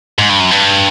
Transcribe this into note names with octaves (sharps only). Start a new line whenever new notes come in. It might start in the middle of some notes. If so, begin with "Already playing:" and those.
G#2
G2
F#2
G2